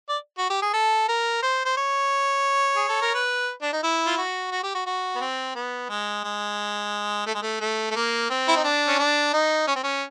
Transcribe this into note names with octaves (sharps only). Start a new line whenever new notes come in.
D5
F#4
G4
G#4
A4
A#4
C5
C5
C#5
G#4
A4
A#4
B4
D4
D#4
E4
F4
F#4
F#4
G4
F#4
F#4
B3
C4
B3
G#3
G#3
A3
G#3
A3
A3
A3
A#3
C4
E4
D#4
D4
C#4
D4
D#4
C#4
C4
C#4